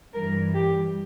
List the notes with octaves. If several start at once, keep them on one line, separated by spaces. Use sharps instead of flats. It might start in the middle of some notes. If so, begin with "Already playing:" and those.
G2 E3 G3 A#4
G4